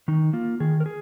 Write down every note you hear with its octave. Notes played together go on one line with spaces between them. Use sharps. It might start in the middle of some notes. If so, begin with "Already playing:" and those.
D#3 D#4
A#3 F4
D#3 G#4
A#4
G#4